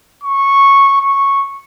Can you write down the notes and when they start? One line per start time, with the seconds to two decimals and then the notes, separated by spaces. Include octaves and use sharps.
0.24 C#6
1.01 C#6